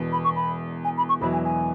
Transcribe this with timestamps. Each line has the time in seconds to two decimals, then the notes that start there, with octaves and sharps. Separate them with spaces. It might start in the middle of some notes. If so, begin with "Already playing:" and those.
Already playing: E1 E2 B2
0.12 B5
0.24 C#6
0.36 B5
0.84 G#5
0.97 B5
1.09 C#6
1.21 E1 E2 B2 F#3 E4 B5
1.32 G#5
1.45 G#5